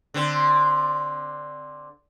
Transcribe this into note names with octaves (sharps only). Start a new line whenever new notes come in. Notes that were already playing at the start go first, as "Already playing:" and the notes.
D3 C4